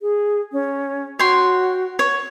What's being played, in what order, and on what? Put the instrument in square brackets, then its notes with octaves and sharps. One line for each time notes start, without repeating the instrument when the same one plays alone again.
[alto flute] G#4
C#4
[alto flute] F#4 [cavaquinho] C#5 G5 C6
[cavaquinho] C#5